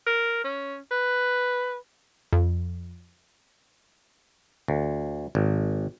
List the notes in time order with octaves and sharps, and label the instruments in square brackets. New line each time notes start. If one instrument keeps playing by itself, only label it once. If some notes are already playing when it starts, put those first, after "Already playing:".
[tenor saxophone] A#4
C#4
B4
[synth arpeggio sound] F2
[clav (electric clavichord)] D2
G#1